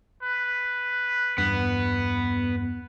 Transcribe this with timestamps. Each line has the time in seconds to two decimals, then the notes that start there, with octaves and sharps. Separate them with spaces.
0.22 B4
1.38 E2 G2 B3